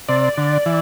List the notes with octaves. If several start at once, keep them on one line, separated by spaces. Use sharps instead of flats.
C3 D5
D3
E3